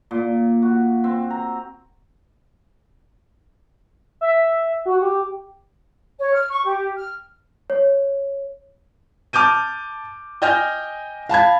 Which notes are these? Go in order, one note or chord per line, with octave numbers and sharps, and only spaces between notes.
A#2
F#4
C4
A#5
E5
F#4
G4
C#5
F6
C#6
G4
F6
C#5
A5 D6 F6 G6 D#7
D#5 G5 G#5 F6 G6 A#6
F5 A5 B5 G#6